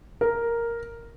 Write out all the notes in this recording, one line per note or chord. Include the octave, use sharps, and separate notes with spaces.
A#4